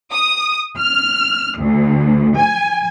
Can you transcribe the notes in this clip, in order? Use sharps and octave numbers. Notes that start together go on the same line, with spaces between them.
D#6
F6
D2
G#5